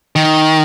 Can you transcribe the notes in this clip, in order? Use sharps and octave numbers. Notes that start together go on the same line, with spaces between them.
D#3